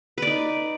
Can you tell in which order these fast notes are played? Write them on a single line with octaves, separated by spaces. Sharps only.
B4 D5 D#4